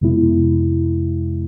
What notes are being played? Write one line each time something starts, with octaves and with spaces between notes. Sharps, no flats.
F2 C3 G#3 B3 E4